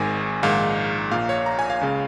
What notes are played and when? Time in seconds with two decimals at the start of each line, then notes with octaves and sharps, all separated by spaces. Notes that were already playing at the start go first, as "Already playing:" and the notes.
Already playing: G#1 G#2 D#3 G#5
0.43 A#1 G#2 D#3 F5
1.12 A#1 A#2 F5
1.29 C#5
1.46 A#5
1.59 G#5
1.70 F5
1.81 C#2 C#3